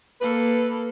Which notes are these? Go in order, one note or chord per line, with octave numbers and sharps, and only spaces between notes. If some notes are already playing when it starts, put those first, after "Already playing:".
A#3 A4 B4